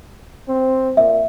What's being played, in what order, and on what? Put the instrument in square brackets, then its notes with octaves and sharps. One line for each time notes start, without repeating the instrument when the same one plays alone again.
[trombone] C4
[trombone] A#2 [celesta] E5